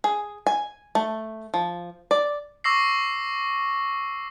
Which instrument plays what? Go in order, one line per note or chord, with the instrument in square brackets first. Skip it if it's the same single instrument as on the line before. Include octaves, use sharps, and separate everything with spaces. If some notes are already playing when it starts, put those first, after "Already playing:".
[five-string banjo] G#4
G#5
A3
F3
D5
[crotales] C#6 D6 E6 A#6 C7